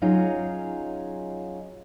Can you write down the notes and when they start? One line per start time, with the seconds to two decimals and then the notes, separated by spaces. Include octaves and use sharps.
0.02 F#3 C#4 D#4 F4 F#4 G#4